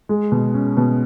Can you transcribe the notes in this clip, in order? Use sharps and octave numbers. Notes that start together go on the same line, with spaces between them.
G#3
B2
C#4
B2